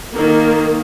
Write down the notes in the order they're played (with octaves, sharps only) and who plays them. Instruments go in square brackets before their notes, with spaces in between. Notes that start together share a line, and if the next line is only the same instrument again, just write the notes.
[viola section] D#3 A#3